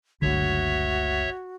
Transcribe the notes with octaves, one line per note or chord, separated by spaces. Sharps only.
F#1 C#2 D3 A3 F#4 C#5 E5